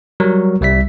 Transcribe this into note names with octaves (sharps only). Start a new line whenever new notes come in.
F#3 G3 A#4
C2 G3 E5 B6